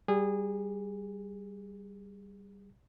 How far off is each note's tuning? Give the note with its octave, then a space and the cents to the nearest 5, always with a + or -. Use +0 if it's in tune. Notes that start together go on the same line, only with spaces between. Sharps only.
G3 +0 G#4 -20